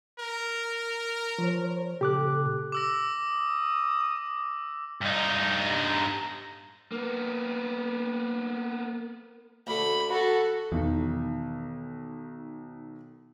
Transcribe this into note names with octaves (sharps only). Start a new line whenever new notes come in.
A#4
F3 C5 C#5
A#2 C#3 G4 A4 D6 F#6
D6 E6 A#6
D#6
G2 D#4
A#3 B3
D2 D3 B5
F#4 A4
B1 E2 D#3